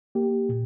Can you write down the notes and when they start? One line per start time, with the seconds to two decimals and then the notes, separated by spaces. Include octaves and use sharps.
0.15 A#3 G4
0.49 A#2